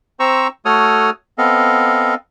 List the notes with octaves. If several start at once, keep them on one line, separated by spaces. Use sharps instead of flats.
C4 C5 A#5 C#6 E6
A3 F#4 A4 C#5 D#6 F6
B3 C4 A4 D#5 F5